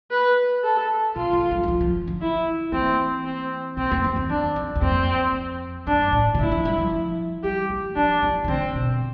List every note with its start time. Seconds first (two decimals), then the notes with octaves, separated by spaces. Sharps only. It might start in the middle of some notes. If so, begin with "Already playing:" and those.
0.11 B4
0.64 A4
1.16 C3 F4
1.33 E3
1.51 G3
1.63 G3
1.68 F3
1.81 F3
2.08 D3
2.21 E4
2.72 E3 C4
3.25 C4
3.77 C3 C4
3.91 F2
4.04 E2
4.16 F2
4.29 E2 D4
4.56 F2
4.76 E2
4.82 F2 C4
5.87 G2 D4
6.12 A2
6.35 C3
6.39 D3 E4
6.52 F3
6.65 G3
6.78 F3
7.43 G3 G4
7.69 F3
7.96 F3 D4
8.22 E3
8.44 E3
8.48 D3 C4
8.75 B2